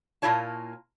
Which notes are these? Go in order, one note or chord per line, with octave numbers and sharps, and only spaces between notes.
A#2 A#3 E4 F4 C#5 A5